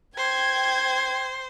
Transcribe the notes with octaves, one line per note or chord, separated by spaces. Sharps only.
C5 G5 G#6